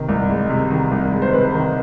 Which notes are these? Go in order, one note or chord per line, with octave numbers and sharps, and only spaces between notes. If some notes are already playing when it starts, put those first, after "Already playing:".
Already playing: C3 D#3
C2
G#3
C3
D#3
C2
G#3
C5
C3 B4
D#3